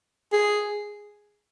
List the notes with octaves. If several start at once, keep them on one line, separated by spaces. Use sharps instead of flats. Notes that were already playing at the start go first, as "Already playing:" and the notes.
G#4